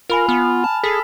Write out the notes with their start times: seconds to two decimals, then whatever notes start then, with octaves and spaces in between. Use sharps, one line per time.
0.10 F4 A#4 G#5 B5 F7
0.29 B3 F6
0.64 A5
0.84 G#4 A4 B6